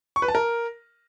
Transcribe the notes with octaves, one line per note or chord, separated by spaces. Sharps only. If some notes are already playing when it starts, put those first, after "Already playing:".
C#6
B4
A5
A#4